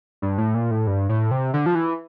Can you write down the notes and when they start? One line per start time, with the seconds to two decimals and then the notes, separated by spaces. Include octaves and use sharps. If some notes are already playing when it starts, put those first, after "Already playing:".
0.22 G2
0.38 A2
0.54 A#2
0.71 A2
0.87 G2
1.09 A2
1.31 C3
1.54 D3
1.66 F3
1.75 E3